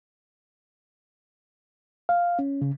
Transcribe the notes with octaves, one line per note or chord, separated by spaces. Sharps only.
F5
C#4
C#3